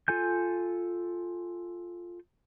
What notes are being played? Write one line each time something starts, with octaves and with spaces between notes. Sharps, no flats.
F4 A4 G#5 G6